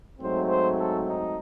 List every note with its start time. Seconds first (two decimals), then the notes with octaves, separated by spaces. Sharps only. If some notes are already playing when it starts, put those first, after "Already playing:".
0.19 G#2 F#3 A3 C4 C5
0.48 C5
0.77 A4
1.07 D#4